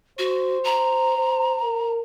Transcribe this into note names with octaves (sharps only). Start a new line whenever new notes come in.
F#4 C5
A#5
C5
A#4